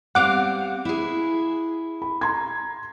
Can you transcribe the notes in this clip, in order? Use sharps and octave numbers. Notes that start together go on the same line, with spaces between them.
G3 C4 F5 F#5 D6
E4 G#4
B5
A#5 C6 G#6